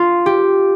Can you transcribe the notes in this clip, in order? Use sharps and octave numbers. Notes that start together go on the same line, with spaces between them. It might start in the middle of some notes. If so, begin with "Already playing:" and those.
Already playing: F4
G4